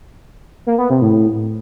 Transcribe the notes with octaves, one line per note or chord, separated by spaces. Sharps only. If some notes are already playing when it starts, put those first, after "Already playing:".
A#3
B3
C3
A2